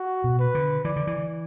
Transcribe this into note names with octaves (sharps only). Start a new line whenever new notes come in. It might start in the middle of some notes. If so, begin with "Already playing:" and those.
Already playing: F#4
B2
B4
D3
E3 D5
D3
E3